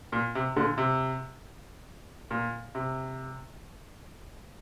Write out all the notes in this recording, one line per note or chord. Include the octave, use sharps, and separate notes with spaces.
A#2
C3
A#2 D3
C3
A#2
C3